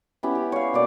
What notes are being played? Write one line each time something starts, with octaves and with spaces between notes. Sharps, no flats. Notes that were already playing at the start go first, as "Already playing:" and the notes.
B3 C#4 E4 G4
G4
C#5 F5
B2 A#3 D5 D#5